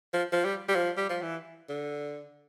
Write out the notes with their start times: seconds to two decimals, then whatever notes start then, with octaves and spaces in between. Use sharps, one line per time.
0.13 F3
0.32 F3
0.44 G3
0.69 G3
0.75 F3
0.97 G3
1.09 F3
1.22 E3
1.69 D3